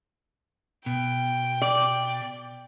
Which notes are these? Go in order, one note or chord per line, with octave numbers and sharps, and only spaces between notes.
B2 G5
D5